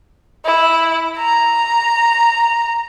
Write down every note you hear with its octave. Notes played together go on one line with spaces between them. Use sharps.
E4
A#5